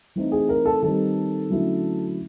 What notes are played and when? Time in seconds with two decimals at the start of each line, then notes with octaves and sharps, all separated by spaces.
0.16 E3 A3 C4 D#4
0.32 G#4
0.49 A#4
0.66 A4
0.83 D#3 G3 C4 D#4 A4
1.50 D3 F#3 A3 C#4 E4